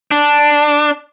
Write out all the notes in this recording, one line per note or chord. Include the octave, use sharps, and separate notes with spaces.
D4